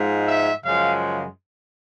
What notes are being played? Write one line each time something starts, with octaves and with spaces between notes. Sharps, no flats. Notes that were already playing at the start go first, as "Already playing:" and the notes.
Already playing: G#2 F3 G#3
E5
F#2 C#3 F3 G#3 F5